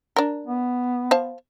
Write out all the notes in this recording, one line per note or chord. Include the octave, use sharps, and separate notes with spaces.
D4 A#4
B3
C5 F5 A5